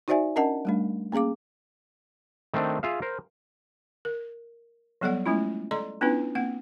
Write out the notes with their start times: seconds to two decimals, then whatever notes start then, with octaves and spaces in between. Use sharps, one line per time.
0.08 D#4 F#4 C5 D5 E5 G#5
0.36 C#4 D4 A#4 D#5 F#5 A5
0.65 G3 A3 D4
1.12 A#3 C#4 G#4 F5 D6
2.54 D#3 A3 C4 D4
2.83 F4 G#4 E5 F5
3.02 A#4 C5
4.05 A#4
5.01 F#3 G3 B3 A4 D5 F#5
5.26 G#3 A3 C#4 E4 F4
5.71 A4 D5 D#5 A#5 C6
6.01 B3 C#4 D4 E4 F4 B4
6.35 A#3 C4 F#5